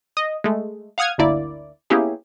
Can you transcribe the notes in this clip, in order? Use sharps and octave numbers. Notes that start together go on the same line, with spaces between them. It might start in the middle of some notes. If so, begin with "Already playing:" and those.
D#5
G#3 A3
F5 F#5 D#6 F6 G#6
G1 D2 D3 A#3 E4 D5
A#3 B3 C#4 E4 G4 G#4